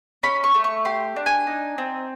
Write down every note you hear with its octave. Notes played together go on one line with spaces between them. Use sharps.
C#4 B5
C#6
A3
C#6
G4 C6
D4
G#5
D#4
C4